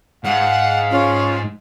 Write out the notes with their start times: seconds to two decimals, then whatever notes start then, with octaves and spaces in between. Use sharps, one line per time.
0.25 G#2 F5 F#5
0.91 C#4 F4